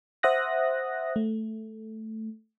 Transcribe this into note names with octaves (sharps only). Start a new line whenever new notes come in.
C5 E5 F#5 D#6 F#6 A#6
A3